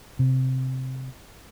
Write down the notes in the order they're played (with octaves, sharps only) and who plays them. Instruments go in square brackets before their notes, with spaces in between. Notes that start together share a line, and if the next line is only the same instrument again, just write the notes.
[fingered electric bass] C3